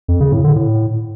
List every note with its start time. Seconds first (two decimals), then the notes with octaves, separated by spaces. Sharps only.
0.08 F2
0.20 C#3
0.32 A2
0.44 D3
0.56 A2